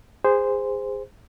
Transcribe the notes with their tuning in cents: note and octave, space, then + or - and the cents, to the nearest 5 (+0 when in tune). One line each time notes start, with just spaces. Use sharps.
G#4 -25 C5 -10